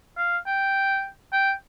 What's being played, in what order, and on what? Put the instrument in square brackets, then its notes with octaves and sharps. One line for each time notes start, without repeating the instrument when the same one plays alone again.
[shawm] F5
G5
G5